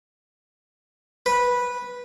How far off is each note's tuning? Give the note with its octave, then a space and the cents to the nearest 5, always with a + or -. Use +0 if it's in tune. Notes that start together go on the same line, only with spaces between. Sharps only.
B4 -10